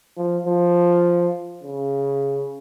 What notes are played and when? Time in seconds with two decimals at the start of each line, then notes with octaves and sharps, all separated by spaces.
0.17 F3
0.46 F3
1.63 C#3